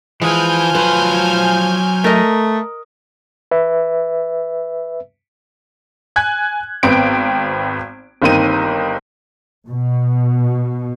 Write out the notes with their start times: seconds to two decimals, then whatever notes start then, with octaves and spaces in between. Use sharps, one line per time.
0.22 E3 F3 G#3 B4 G#5 F6 G6
0.75 F#3 B4 C5
2.04 A3 A#4 D#5
3.51 B4 E5
6.16 G#5 F#6 G#6
6.83 G#1 B3 C4 G5 D7
8.22 G1 D#3 A#3 C4 D#4 D#7
9.67 B2